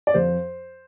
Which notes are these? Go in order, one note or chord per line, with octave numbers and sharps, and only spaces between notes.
D5
F2 F3 C5